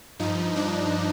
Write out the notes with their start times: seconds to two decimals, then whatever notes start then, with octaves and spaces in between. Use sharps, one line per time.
0.19 G2 F3 D#4
0.56 D4